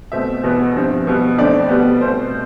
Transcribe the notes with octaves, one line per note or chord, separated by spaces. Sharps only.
B2 A3 C4 E5
E2 B2 B3
G2 F3 C4
B2 G3 B3
F2 D3 A3 C4 D5
B2 G3 B3
B2 A3 C4 C5